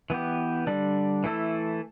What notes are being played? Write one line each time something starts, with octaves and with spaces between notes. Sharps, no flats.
E3 B3 G4
D3 G3 D4
E3 A3 E4 A4